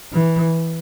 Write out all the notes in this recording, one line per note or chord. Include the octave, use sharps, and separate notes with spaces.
E3